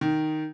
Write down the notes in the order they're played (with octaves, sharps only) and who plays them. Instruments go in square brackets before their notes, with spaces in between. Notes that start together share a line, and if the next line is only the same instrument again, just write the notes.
[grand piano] D#3